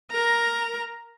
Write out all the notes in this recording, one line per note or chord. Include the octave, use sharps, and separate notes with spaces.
A#4 A#5